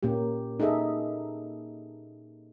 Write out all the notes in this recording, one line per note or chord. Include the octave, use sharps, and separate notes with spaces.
A#2 A#3 C#4 G4
D#4 G#4 A4 D#5 E5